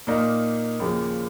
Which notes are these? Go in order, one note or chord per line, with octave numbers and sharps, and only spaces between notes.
A#2 A#3 D#4
D#2 C#3 F3 A#3